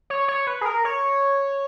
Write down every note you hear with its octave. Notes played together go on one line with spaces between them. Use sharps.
C#5
C#5
B4
G#4
A#4
C#5